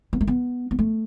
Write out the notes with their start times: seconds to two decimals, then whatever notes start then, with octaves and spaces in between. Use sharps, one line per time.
0.13 B3
0.21 A3
0.27 B3
0.71 B3
0.79 A3